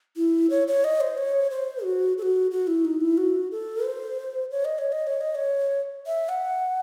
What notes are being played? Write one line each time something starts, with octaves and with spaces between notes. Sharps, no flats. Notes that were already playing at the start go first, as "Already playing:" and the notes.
E4
C#5
C#5
D#5
C5
C#5
C5
F#4
A4
F#4
F#4
E4
D#4
E4
F#4
A4
C5
C#5
D#5
C#5
D#5
C#5
D#5
C#5
E5
F#5